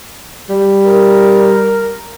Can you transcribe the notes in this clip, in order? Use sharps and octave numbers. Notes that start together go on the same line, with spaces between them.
G3
A#4